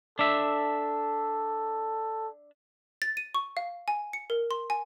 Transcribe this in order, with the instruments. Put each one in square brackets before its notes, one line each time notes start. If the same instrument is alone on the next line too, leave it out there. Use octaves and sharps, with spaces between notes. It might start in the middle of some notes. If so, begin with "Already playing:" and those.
[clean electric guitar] D4 E5 [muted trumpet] A4
[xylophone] A6
D#7
C#6
F5
G#5
C#7
A#4
C6
G#5